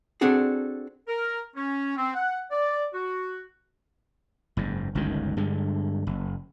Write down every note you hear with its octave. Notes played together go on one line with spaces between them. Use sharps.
C4 D4 F#4 G#4 A4
A#4
C#4
C4
F#5
D5
F#4
F#1 G#2
G1 C#2 F#2 D#3
G2 D3 G#3
F#1